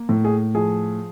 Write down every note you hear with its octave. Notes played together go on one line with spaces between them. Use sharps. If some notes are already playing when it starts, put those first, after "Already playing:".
Already playing: A#3
A2
G#4
F3 G#4